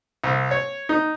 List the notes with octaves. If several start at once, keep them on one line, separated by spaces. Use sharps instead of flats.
C2
C#5
D#4